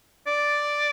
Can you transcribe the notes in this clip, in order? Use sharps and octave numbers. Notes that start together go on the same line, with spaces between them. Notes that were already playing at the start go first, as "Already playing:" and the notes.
D5